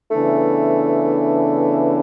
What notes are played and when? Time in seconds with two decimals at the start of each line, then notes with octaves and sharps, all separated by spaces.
0.11 C#3 E3 A3 B3 D4